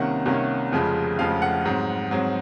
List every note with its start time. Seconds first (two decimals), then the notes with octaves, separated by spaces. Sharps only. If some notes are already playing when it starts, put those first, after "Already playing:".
Already playing: C2 C3 D#3 A#3 C#4 F#5
0.26 C2 C3 D#3 A#3 C#4
0.72 F1 F2 C#3 F3 G#3
1.19 F1 F2 C#3 F3 G#3 F5
1.42 F#5
1.65 G#2 F#3 C4
2.11 G#2 F#3 C4